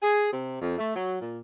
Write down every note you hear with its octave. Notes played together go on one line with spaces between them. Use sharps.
G#4
C3
F2
A3
F#3
A#2